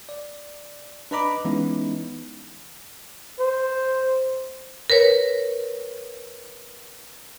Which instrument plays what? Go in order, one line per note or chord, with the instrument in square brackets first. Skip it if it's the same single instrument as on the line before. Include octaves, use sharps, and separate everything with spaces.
[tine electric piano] D5
D4 B4 D#5 A#5 B5 D6
E3 G#3 B3 C#4 D#4 E4
[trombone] C5
[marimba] A#4 B4 C#5